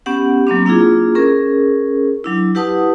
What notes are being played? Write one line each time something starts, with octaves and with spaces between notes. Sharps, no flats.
B3 C#4 G4 F#5
F#3 A#3 C4 D4
A#3 D4 E4 F4 G#4
C#4 G#4 A#4
F#3 D4 E4
E4 G4 B4 F#5 A5 D#6